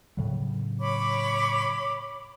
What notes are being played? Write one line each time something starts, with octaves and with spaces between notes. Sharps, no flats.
A2 C#3 F#3
C#5 B5 D6